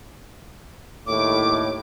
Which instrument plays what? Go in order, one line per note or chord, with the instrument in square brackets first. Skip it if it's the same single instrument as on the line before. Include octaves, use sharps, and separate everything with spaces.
[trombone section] D#2 A2 [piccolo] D6